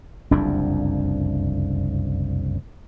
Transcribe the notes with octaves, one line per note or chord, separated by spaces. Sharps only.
F#1 C2 F2 D4